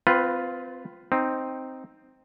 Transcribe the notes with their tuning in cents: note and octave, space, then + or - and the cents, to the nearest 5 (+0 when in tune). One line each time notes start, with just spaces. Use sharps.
C4 -25 F4 +0 B4 +0
C4 +0 D#4 +0